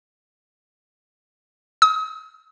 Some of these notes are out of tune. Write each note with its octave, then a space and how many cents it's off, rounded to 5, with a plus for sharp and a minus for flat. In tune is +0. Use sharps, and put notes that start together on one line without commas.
D#6 +40